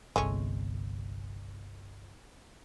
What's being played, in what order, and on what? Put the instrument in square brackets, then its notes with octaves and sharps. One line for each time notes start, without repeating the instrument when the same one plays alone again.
[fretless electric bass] G1 C2 [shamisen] G#3 A3 C#4